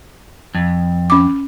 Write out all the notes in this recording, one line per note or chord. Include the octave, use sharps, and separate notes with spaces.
F2
C#4 D6